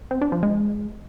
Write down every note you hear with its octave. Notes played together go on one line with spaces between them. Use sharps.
C4
D4
F3
G#3